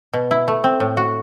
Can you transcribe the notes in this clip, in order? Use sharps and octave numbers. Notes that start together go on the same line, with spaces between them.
B2
E4
A3
C4
A2
F#4